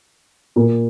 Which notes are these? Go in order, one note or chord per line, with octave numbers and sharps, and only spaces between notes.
A#2 A#3